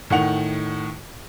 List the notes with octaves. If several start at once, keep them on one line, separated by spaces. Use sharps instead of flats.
A2 D#3 F#5 F7